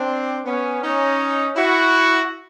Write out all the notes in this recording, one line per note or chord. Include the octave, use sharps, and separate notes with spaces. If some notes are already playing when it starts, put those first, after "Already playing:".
Already playing: C4 D4
B3 C#4
C#4 D#4
E4 F#4